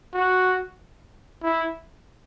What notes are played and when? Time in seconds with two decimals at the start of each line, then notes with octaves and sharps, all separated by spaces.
0.14 F#4
1.43 E4